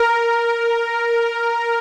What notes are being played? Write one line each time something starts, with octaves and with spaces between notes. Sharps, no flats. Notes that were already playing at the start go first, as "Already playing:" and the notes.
Already playing: A#4